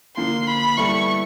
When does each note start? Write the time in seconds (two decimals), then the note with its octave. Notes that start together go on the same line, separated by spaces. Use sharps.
0.17 D3 F3 A#3 C6
0.47 B5
0.77 G3 B3 E4 A4 C#6